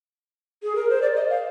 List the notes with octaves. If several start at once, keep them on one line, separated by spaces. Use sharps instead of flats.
G#4
A#4
C5
D5
D#5
F5